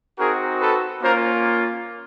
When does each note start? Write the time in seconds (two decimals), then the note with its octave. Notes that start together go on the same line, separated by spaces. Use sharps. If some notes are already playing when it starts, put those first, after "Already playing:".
0.18 C4 D#4 F#4 G#4 A#4
0.60 A4 B4
1.02 A#3 C#4 F4 A#4 C5